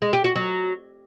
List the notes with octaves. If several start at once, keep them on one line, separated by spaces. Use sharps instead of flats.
G#3
G4
F#4
F#3